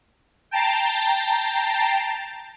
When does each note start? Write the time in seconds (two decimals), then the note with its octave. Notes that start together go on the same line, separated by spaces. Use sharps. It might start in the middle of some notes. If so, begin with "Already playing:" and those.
0.51 G5 A5 A#5 A6 C7